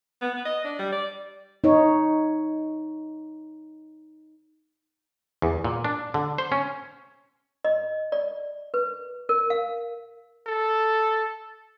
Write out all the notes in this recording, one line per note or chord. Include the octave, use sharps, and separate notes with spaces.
B3
B3
D#5
D4
G3
D5
D#4 C#5
E2
A#2
D4
D3
C5
C#4
D#5
D5
B4
A#4
F5
A4